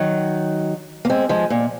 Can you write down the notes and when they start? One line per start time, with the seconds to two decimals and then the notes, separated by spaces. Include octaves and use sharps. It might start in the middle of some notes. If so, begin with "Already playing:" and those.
Already playing: D#3 F#3
1.05 A#3
1.10 G#3 C4
1.29 F3 G#3
1.50 A#2